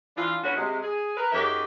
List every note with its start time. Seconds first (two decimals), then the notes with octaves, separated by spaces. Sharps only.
0.16 E3 D4 F4
0.43 D2 B3 C#4 E4 F#4
0.56 C3 G#3
0.83 G#4
1.17 A#4 B4
1.32 F#2 D#4 G4 G#4 E5